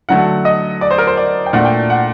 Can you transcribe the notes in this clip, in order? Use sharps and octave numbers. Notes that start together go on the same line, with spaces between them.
D3 F#3 A3 F#5
D#5
D5
C5
A#4
C5
D5
G5
A#2 A3 D4 F#5
G5
F#5